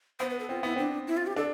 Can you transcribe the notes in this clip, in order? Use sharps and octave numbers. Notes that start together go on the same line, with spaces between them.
B3 C5
B4
A4
C4 F4
B3 E4
C4 D4
E4
F4
G4
D4 A4